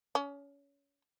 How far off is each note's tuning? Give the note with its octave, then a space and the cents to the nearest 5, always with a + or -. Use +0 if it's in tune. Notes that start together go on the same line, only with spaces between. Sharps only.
C#4 +25